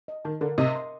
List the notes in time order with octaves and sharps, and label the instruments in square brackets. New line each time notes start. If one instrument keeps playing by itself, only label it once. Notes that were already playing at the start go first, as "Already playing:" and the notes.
[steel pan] D#5
[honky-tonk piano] D#3 [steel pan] A5
[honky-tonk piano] D3 [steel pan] A#4
[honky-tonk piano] C3 [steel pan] D#5
[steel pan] C6